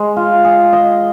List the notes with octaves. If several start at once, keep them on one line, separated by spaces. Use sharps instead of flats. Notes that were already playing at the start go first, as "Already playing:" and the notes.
Already playing: G#3 C5
F4
G#4
D#5